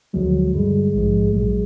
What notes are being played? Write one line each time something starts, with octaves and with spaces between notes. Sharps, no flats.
D2 D3 F3 F#3 G#3
G2 D3 G3 G#3
A#1 G#2 F3
A#1 A#2 F#3 G#3